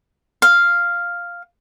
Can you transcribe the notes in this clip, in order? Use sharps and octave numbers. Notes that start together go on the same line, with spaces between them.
F5